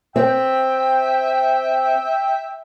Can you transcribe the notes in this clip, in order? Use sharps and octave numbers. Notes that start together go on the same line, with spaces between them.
C4 E5 G5